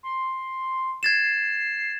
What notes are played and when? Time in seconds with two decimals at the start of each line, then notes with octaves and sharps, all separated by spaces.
0.03 C6
1.03 G#6 A6 C7 E7